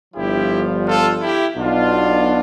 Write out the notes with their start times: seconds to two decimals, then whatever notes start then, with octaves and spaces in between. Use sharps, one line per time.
0.14 G1 G2 F3 E4 G4
0.85 F4 A4
1.20 E4 G4
1.56 B1 B2 D4 F4